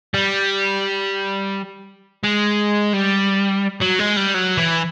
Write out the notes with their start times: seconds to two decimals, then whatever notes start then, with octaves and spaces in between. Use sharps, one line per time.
0.14 G3
2.24 G#3
2.94 G3
3.81 F#3
3.99 G#3
4.16 G3
4.34 F#3
4.57 E3